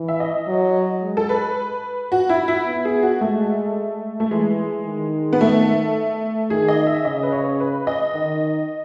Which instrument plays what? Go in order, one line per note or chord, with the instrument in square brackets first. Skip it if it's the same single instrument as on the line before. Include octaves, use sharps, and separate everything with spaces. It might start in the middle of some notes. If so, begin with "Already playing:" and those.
Already playing: [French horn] E3
[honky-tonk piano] E5
D#5
[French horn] F#3
G#3
[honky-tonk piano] A4
B4
F#4
E4
E4
[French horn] B3
[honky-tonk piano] G#4
F#4
[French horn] G#3 [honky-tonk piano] A3
[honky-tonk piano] A3
[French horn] E3 [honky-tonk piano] G#3
[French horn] D#3
[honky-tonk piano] B3
A3
[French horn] D#3 [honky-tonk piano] G#4
[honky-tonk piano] D#5
E5
[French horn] C#3 [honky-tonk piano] D#5
[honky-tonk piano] B4
C#5
B4
D#5
[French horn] D#3